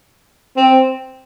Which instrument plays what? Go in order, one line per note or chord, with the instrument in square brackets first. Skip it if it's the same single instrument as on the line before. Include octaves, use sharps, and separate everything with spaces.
[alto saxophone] C4